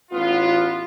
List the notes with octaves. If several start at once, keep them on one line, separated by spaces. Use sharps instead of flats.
A1 B3 F4